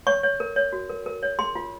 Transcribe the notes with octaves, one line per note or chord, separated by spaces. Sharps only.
C#5 C#6
C#5
A#4
C#5
F#4
A#4
A#4
C#5
G#4 C6
F4